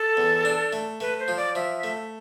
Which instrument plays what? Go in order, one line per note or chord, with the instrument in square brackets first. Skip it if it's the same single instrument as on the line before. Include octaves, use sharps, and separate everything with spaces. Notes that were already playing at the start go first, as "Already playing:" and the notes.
Already playing: [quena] A4
[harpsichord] E2
D4
A3
[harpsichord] A3 [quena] B4
[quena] C5
[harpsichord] F3
[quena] D5
[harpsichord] F3 [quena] E5
[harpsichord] A3